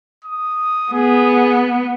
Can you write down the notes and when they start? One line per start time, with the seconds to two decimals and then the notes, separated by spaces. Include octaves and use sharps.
0.24 D#6
0.93 B3 G#4